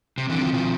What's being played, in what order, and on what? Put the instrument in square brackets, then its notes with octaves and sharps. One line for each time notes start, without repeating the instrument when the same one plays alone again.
[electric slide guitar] C3 [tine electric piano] C4
[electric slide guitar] D3 E3
[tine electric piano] C4
[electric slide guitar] D#3 F3
[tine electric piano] B2 [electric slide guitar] D#3 F3